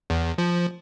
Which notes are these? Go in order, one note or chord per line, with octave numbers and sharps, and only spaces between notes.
E2
F3